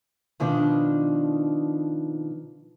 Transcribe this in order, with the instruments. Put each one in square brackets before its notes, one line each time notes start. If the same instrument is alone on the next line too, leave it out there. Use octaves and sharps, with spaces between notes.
[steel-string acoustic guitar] B2 D#3 F3 D4